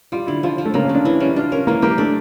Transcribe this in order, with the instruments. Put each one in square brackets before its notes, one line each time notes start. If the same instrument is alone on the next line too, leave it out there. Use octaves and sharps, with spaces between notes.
[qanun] G3 [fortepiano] F4
[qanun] D3 [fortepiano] E4
[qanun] F3 [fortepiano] F4
[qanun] F3
[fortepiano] A3
[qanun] C#3 [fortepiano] A#3
[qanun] C#3 [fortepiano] C#4
[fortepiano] D4
[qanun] E3 [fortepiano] E4
[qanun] G3 [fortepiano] C#4
[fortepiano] D4 [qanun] F4
[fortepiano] C#4 [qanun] A#4
[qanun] E3 [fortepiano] A#3
[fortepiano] A#3 [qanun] G4
[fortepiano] A3 [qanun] D4